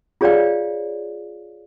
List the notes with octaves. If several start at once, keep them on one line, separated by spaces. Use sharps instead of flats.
F4 G#4 C#5 D5 F5 G5